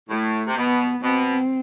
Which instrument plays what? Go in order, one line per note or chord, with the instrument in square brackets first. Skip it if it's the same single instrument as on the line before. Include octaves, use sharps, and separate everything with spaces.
[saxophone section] A2 [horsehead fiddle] A3
[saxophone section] C3
[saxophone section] B2 [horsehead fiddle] B3
[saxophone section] B2 [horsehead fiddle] C4